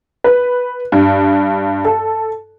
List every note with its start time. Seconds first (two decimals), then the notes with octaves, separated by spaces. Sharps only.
0.24 B4
0.92 G2
1.85 A4